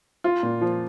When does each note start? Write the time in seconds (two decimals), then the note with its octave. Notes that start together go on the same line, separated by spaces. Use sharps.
0.24 F4
0.43 A#2
0.61 F3